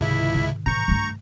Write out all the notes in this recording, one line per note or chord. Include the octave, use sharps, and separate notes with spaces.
C#2 G#2 C3 D#3 E4 E5
C#3
A2 E3 A#5 C#6 G6
G2 A3